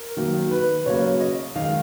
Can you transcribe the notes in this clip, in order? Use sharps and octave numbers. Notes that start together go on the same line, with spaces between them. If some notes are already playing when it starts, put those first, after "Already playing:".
Already playing: A#4
D#3 F#3 A#3
B4
C#3 F#3 A#3 C#5
D#5
D#3 G#3 F5